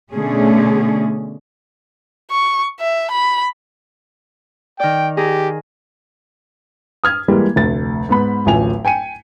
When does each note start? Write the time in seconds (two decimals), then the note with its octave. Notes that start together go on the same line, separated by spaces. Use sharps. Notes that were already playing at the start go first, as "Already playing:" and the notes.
0.12 B2 D3 A3 C#4 G#4
2.31 C#6
2.80 E5
3.12 B5
4.80 D#3 D5 G5
5.17 G4 G#4 A#5
7.04 D#6 F6 G#6
7.28 E3 G3 G#3 A#3
7.56 F1 D2 A6
8.09 G#2 B3 B5
8.46 D1 A1 F3 G#5 F7
8.85 G5 G#5 C#7 D#7